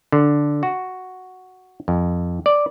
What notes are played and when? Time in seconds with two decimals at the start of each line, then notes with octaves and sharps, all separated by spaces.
0.12 D3
0.63 F#4
1.88 F2
2.46 D5